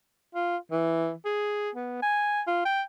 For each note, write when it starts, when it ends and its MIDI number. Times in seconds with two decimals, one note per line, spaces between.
0.35 0.57 65
0.71 1.13 52
1.25 1.70 68
1.75 2.01 59
2.02 2.41 80
2.47 2.61 65
2.66 2.82 79